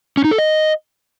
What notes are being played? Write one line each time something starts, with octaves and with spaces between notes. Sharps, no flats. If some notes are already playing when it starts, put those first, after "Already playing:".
C#4
D#4
A4
D#5